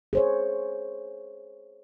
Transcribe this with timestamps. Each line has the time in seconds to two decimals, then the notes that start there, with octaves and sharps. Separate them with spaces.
0.13 G#4 C5 C#5